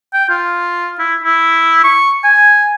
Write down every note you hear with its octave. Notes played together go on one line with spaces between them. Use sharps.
G5
F4
E4
E4
C#6
G#5